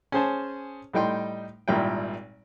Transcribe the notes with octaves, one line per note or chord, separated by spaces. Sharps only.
C#4 G#4 C5 A5
A2 G3 D#4 G5 C6
G#1 A#2 G3 E4 G5